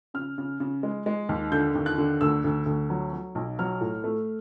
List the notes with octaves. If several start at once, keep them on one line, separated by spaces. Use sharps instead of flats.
C#3 F6
C#3
C#3
G#3
G#3
D#2
D3 G6
D#2
F#6
D3
D2 E6
D2
D2
F#3
F#3
B1
F#3 F6
A2
A3